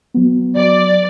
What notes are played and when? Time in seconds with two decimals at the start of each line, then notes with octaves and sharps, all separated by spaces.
0.14 F#3 B3
0.56 F#3 D5